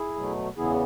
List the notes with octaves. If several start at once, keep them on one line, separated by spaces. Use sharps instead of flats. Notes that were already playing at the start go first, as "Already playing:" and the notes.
Already playing: E4 G#4
B2 F#3 A3
E2 C#3 E3 B3 E4 G#4